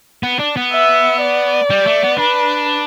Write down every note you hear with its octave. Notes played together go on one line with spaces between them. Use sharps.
B3
D4
B3
E5
D5
G3
A3
B3
D4 B4